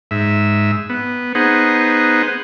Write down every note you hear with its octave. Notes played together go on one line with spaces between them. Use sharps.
G#2 E5
B3
B3 D#4 G#4 C5 F#5